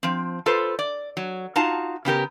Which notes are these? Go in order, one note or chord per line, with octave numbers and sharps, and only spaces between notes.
F3 C4
F4 A4 B4 C5
D5
F#3
D#4 F4 F#4 F5 A5
C#3 B3 G4 A#4